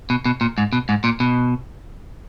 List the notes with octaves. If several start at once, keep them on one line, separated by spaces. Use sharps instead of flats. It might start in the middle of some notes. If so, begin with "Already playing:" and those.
B2
B2
A#2
G#2
B2
G#2
A#2
B2